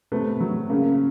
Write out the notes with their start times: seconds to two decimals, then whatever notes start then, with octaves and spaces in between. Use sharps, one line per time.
0.12 C3 A3 B3
0.40 F#3
0.69 C#3 A#3